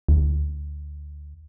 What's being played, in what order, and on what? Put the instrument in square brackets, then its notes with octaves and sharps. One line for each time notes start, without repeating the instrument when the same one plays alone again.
[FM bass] D2